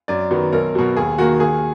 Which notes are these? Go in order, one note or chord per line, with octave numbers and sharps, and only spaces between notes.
F#2 D5
D#3 F#3 B3
B1 A#4
B2 F#3
D#2 G#4
D#3 A#3 F#4
D#2 G#4